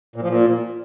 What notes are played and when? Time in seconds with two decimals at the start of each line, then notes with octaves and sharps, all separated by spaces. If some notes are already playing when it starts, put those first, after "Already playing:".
0.16 A#2
0.22 F3
0.29 A#2